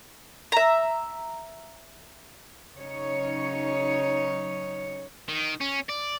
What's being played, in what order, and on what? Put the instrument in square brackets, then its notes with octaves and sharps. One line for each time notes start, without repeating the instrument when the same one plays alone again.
[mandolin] E5 A#5
[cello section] C#3 F#3 C#4 D#4 C#5
[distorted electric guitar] D#3
C#4
D5